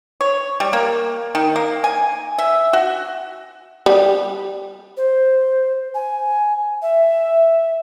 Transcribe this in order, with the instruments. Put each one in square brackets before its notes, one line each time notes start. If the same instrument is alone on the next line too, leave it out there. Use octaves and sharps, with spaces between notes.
[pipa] C#5
G3
A#3
D#3
A#3
G#5
E5
F#4
[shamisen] G3
[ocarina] C5
G#5
E5